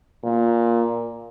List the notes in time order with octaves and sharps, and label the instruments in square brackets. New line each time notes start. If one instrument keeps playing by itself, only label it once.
[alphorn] A#2